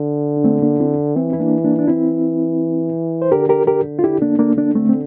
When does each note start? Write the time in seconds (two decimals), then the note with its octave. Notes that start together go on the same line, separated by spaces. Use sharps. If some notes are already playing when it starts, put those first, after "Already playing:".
Already playing: D3
0.37 D4
0.44 A3 C4
0.62 A#3 D4
0.80 C4 E4
1.16 E3 C4 E4
1.33 E4
1.40 A#3 D4
1.64 A#3 D4
1.79 D4
1.88 E3 C4 E4
3.22 C5
3.32 D3 G4 A#4
3.49 G4 A#4
3.67 G4 A#4
3.99 F4
4.04 E4 G4
4.22 A#3 D4
4.39 A#3 D4
4.57 A#3 D4
4.75 A3 C4
4.89 C4